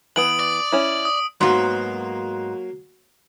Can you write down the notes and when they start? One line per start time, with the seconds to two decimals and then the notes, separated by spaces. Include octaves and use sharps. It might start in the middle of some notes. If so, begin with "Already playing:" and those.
0.16 E3 B3 D#6 D7 F#7
0.40 D5
0.72 C#4 E4
1.05 D#6
1.41 G#2 F#3 A#3 B3